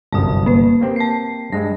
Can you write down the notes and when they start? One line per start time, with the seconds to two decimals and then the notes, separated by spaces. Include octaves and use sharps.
0.12 G1 C2 F#2 A5 D#6
0.46 A#3 B4
0.81 A#3 C4 G4
0.96 A5 C7
1.52 G2 G#3 A#6